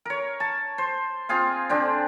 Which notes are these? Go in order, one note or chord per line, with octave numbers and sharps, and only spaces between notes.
A#4 C#5
A5
C5
C4 F4 G#4 F5
D3 C4 D4